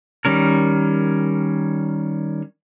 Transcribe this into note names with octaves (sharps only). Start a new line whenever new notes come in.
D#3 G3 C#4 A#4